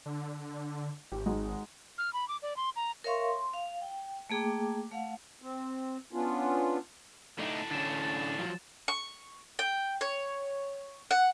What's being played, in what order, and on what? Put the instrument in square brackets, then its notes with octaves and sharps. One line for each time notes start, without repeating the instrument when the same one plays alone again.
[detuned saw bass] D3
[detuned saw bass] G#1 [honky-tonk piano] G4
[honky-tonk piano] G#3 D#4 F#4
[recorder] F6
B5
D6
D5
C6
A#5
[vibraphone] A#4 C#5 E5 F5 C6 C#6
C6
F5
G5
A3 A#3 G#4 G5 D6
A3 F5 F#5
[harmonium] C4
B3 C#4 D4 F4
[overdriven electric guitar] A2 D4 [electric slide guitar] A3 D#4
[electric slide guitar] D3 C#4 [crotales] A6 D#7 E7
[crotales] A6
[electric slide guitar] F3 F#3
[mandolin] C#6
G5
C#5
F#5